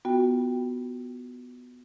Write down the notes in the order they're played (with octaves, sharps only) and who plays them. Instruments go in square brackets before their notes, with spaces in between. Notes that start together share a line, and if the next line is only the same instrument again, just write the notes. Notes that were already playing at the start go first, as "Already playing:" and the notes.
[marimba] B3 F4 F#4 G5